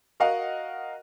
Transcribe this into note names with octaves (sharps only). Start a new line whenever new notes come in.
F#4 A#4 D#5 F5 F#5